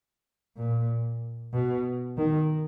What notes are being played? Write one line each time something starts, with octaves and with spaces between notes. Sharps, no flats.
A#2
B2
D#3